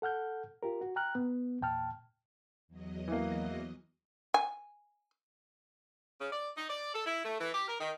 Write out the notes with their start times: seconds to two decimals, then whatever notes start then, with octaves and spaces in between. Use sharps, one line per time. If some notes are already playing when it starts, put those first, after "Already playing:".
0.02 A4 F#5 F6 G6
0.63 F4 G4 A#4
0.81 F#4
0.96 G5 A#5 F6 F#6
1.15 B3
1.61 E2 A#2 G5 A5 F6
2.68 E2 F#3 D#5
3.08 E3 A#3
4.34 G#5
6.19 C#3
6.31 D5
6.57 D#4
6.69 D5
6.94 A4
7.06 E4
7.24 A3
7.40 E3
7.53 G4
7.68 A#4
7.80 D#3